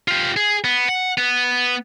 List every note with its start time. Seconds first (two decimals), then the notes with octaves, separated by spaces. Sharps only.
0.08 F4 G4
0.36 G#4
0.64 B3
0.89 F#5
1.18 B3